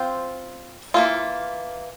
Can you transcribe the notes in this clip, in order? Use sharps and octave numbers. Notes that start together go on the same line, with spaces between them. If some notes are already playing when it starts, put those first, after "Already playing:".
Already playing: C4 F4 C5
E3 A#3 F4